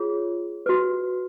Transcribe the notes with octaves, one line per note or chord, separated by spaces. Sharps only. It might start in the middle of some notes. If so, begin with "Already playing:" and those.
Already playing: F4 G#4 C#5
F#4 B4